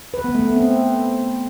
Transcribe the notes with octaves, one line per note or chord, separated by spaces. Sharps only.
B4
B3
A3
B3
C4